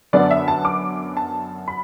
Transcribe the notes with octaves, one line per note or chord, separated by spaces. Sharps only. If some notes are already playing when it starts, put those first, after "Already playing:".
F#2 D3 B3 D4 D5
E5
A5
D6
A5
B5